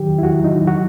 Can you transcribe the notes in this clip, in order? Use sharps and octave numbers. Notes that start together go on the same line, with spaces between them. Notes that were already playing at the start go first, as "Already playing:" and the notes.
Already playing: D#3 F#3 G4
E2
E4
E2 F#4
F#3
D#4
D#3
F#3 F#4